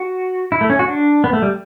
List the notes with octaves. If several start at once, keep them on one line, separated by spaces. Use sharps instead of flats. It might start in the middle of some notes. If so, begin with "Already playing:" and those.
Already playing: F#4
E4
A3
C#4
F#4
D4
B3
A3
G3